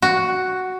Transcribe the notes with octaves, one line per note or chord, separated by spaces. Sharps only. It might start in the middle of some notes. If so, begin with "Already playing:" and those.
F#4